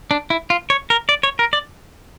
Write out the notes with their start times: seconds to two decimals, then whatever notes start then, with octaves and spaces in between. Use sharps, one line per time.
0.11 D4
0.30 E4
0.50 F4
0.70 C#5
0.90 A#4
1.09 D5
1.23 C#5
1.39 A#4
1.53 D5